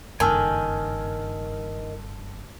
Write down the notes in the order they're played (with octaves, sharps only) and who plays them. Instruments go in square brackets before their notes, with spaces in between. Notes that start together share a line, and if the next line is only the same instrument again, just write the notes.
[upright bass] F#1 G2 [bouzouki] D#3 [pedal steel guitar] G#5 [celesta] A5 E6 F6